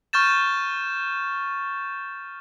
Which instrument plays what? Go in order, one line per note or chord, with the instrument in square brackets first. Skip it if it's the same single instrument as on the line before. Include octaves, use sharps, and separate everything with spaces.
[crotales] C#6 F6 G6 A6 E7